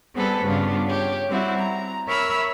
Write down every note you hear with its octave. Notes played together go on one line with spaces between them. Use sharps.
G3 B3 C4 G#4 A4 B4
G2 C#3 B3 D4 F4
G4 C#5
G3 C4 E4 F#4
A#5
A#4 C#5 E5 B5 E6 F6